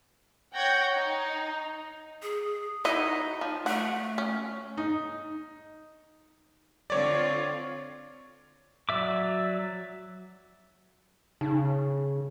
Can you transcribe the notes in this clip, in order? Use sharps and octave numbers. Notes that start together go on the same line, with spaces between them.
C#5 F#5 G5 G6 G#6 A#6
D#4
G#4
F#3 D#4 E4 D#5
F3
A3 F#5
C#4
D#4
D3 C4 F4 C#5 D5
F#3 D5 E5 D6
C#3 D#4